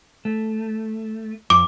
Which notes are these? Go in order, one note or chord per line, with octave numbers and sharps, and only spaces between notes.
A3
F2 D6